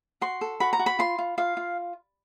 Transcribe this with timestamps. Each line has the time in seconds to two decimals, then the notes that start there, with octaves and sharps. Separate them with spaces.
0.21 F#4 C6
0.41 A4
0.60 F#4 B5
0.73 A#5
0.79 F#4
0.86 B5
0.99 F4 C6
1.18 F4
1.38 F4 F5
1.57 F4